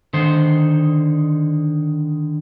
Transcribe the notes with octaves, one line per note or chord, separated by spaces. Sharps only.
D3 D#3 D#4 C5